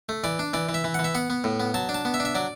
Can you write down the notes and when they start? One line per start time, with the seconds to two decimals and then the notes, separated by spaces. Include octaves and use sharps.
0.09 A3
0.24 E3 D5
0.39 D4
0.54 E3 D5
0.69 E3
0.74 E5
0.84 E3
0.94 E3 F#5
1.04 E5
1.15 B3 F#5
1.30 B3
1.44 A2
1.60 B3
1.74 F#3 A5
1.89 D4
1.94 A5
2.05 B3
2.14 E5
2.20 D4
2.25 E5
2.35 F#3 D5